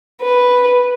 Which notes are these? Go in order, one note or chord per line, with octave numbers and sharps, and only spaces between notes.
B4